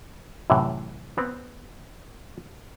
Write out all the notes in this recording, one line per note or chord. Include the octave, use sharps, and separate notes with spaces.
F#2 A2 C3 E3
B3 C4